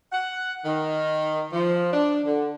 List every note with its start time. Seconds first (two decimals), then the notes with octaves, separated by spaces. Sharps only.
0.12 F#5
0.65 D#3
1.52 F3
1.93 D4
2.25 D3